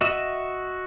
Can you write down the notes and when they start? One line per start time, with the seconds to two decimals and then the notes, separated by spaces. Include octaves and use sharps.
0.01 F#4 D#5 E5